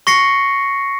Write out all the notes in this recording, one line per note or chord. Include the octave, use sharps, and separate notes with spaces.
C#6 A#6 C7 C#7